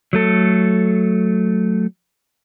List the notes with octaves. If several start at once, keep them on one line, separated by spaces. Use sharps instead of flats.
F#3 A3 A4